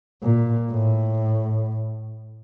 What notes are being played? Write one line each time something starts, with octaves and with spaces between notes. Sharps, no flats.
A#2
A2